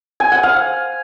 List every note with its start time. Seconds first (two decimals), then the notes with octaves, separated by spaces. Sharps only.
0.20 G#5
0.32 F#5
0.43 F5